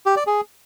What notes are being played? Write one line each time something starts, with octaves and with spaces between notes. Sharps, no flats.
G4
D5
G#4